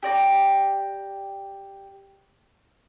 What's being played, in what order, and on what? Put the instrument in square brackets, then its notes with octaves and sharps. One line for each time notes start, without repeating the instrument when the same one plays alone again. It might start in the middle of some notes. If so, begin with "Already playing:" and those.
[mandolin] G4 D5 A#5